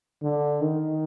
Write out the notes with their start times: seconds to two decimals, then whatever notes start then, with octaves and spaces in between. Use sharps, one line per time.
0.23 D3
0.62 D#3